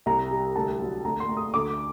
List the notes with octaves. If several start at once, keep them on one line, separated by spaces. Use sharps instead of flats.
C2 A#5
G3
D2 A5
F#3
D2 A#5
C6
A3
D#6
D2 D6